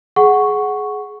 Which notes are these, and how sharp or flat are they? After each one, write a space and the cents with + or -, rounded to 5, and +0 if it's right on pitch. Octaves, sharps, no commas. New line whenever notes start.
G#4 +20 F#5 +0 C#6 +0